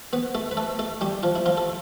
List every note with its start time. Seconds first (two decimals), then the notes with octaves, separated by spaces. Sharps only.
0.13 B3 B4
0.35 A3 A4
0.51 B4
0.57 A3 A4
0.79 A3 A4
1.01 G3 G4
1.23 F3 F4
1.35 E4
1.46 F3 F4
1.57 A4